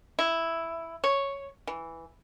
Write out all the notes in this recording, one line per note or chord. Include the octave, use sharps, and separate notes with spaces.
E4
C#5
E3